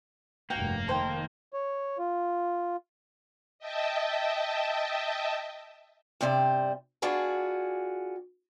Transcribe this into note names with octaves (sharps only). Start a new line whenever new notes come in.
F1 G2 A#3 F#4 G5
D#3 A4 C5 G5
C#5
F4
D#5 E5 G5 A5
G2 C3 G3 C5
D4 F4 F#4 G#4 B4